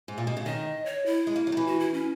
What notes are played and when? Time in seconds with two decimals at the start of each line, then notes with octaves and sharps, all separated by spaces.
0.08 G#2
0.18 A#2
0.27 B2
0.37 C#3
0.46 D#3 D#5
0.86 C#5
1.06 E4
1.27 G#3
1.36 A#3
1.47 F#3
1.52 D#3
1.57 E3
1.67 F#4
1.80 E4
1.94 C#4